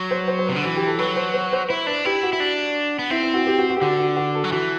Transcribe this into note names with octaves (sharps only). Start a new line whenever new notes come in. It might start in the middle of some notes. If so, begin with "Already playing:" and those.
Already playing: F#3
C5
C5
C5
C3 B4
D3
E3 F#4
G4
A4
F#3 B4
C5
C5
C5
E4 C5
D4 B4
E4 G4
F#4
E4
D4
B3
C4 E4
E4
F#4
G4
F#4
F#4
G4
D3 F#4
F#4
F#4
A4
F#3
E3 F#4